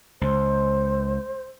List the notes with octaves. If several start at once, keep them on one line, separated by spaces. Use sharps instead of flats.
C#2 C5